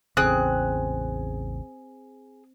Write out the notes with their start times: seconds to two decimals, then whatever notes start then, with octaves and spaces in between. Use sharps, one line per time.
0.17 A1 E2 C#3 C4 G#4 F#6